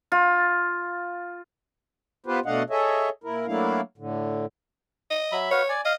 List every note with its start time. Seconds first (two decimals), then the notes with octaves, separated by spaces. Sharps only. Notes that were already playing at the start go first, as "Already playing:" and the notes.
0.12 F4
2.26 B3 F4 G4 B4 C5
2.46 B2 A3 D4 D#5 F5 F#5
2.70 G#4 A4 C#5 D#5 E5
3.24 A#2 E4 A#4
3.47 F#3 A3 A#3 D4 E4 F5
3.98 A2 D3
5.11 D#5
5.32 F#3 E5 B5
5.51 F#4 B4 C#5 F5
5.69 D5 G#5
5.85 D#5 F5